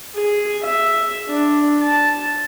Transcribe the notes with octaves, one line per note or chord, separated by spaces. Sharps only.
G#4
E5
D4
A5